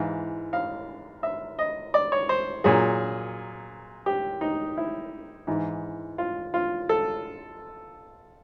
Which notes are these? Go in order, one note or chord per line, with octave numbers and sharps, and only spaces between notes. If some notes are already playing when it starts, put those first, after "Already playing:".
Already playing: G#2 E3 F5
F5
E5
D#5
D5
C#5
C5
A#2 F#3 G#4
G4
D#4
E4
G#2 E3
F4
F4
A4